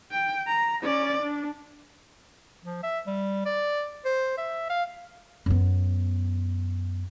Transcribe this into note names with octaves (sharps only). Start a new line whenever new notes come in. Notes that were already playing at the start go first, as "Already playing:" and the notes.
G5
A#5
C#4 D5
D4
F3
E5
G3
D5
C5
E5
F5
F#2 B3